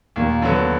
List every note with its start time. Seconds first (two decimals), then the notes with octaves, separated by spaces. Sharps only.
0.16 D#2 A#2 A#3
0.42 D3 F#3 B3